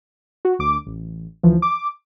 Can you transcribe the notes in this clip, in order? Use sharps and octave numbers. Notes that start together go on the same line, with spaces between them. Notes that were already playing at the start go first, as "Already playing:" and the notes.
F#4
D2 D6
A1
D2 E3 F3
D6